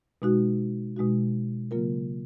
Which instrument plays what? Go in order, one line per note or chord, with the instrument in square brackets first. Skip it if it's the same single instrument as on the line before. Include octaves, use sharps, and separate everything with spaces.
[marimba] B2 G#3 D#4 F#4
B2 G#3 D#4 F#4
C#3 F#3 A#3 F4 A#4